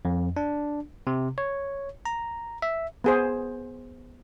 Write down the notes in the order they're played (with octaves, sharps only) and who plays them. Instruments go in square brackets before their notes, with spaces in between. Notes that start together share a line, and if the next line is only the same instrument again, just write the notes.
[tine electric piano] F2
D4
C3
C#5
A#5
E5
[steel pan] B3 G#4 C5